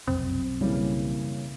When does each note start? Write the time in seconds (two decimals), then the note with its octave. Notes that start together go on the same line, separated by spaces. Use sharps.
0.07 F1 B1 F#2 C4
0.61 C#3 E3 G3 G#3 A#3